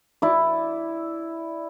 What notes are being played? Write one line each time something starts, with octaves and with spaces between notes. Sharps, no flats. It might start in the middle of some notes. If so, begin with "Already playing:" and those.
E4 D5